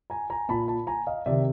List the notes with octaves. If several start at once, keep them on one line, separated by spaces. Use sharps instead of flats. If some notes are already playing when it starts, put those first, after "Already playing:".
G#5 A#5
G#5 A#5
A#2 A5 B5
A5 B5
G#5 A#5
D#5 F5
C3 D#3 D5 E5